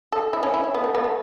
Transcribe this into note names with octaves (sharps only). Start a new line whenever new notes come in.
A4
E4
C#4
E4
C#4
B3
A3
B3
A3